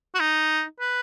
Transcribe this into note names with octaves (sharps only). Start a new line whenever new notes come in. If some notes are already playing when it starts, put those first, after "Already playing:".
F#4
D#4
B4